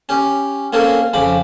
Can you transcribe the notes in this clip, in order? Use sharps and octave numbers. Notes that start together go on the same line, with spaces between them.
C#4 G4
A#3 C4 C#4 G#4 A4
F2 C#3 C4 B5 D6